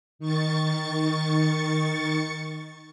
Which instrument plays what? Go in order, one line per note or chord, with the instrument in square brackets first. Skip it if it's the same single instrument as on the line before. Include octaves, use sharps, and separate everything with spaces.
[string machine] D#3 C#6 A6 C#7